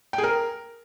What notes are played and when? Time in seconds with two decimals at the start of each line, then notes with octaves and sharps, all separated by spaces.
0.13 G5
0.18 G#4
0.23 A#4